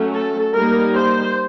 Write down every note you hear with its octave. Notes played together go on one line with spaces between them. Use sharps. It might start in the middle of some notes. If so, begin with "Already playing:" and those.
Already playing: F#3 A3 C#4
A4
G3 A#3 D#4 A#4
C5